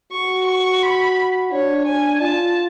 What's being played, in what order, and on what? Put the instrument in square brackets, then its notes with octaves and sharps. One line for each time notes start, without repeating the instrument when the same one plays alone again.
[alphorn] F#4 [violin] C#6
[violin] C#6
B5
[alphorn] D4 [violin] C#5
[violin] G#5
[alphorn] F4 [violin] A5